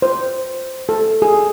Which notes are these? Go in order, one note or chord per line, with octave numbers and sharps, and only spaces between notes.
C5
A4
G#4